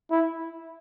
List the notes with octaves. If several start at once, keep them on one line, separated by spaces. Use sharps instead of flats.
E4